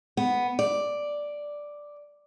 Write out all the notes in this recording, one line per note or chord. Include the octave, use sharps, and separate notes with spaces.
B3
D5